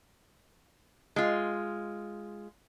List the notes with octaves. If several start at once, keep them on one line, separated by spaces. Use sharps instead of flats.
G#3 F4